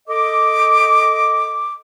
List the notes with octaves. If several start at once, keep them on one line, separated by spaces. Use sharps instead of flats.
A4 D#5 D6